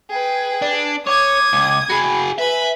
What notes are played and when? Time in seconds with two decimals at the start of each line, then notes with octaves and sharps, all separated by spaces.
0.10 G#4 B4 G5
0.62 D4
1.07 C#5 D6 D#6 G#6
1.53 C#2
1.90 F#4 G#4 B5
2.39 B4 E5 G#5 B5